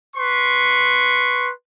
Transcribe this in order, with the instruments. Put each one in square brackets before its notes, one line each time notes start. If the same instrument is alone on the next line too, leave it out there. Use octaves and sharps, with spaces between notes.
[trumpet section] B4 C6 C#6